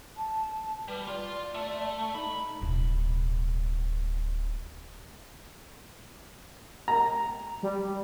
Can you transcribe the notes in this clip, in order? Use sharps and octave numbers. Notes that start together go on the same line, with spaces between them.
A5
G3 B4
F4 D5
A3
D#4 B5
D1 B2
A#5
G3